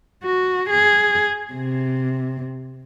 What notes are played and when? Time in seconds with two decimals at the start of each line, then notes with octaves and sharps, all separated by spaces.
0.24 F#4
0.70 G#4
1.53 C3